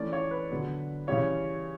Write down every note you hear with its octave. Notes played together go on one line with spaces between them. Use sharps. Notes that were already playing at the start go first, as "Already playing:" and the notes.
Already playing: E3 A3 C#4 D5
C#5
B4
D3 F#3 B3 D4
C#3 E3 G3 C#4 C#5